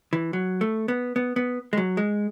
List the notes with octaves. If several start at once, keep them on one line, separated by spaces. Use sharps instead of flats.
E3
F#3
A3
B3
B3
B3
G#3
F#3
G#3